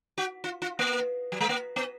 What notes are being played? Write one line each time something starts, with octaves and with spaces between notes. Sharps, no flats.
F#4
F4
F4
A#3
F#3
G#3
A#3
B3